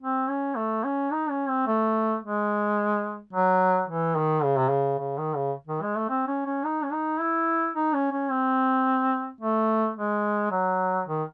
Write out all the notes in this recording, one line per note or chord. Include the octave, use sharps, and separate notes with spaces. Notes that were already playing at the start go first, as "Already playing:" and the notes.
C4
C#4
A3
C#4
D#4
C#4
C4
A3
G#3
F#3
E3
D#3
C#3
C3
C#3
C#3
D#3
C#3
D#3
G#3
A3
C4
C#4
C#4
D#4
C#4
D#4
E4
D#4
C#4
C#4
C4
A3
G#3
F#3
D#3